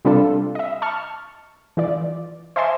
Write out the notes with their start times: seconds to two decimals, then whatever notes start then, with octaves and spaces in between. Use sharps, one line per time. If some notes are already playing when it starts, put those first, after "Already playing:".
0.05 C3 G3 D4 F4 A4
0.55 D#5 E5
0.82 A5 C#6 F6
1.77 E3 F4 D5
2.56 C5 D#5 E5 G#5 A5 C6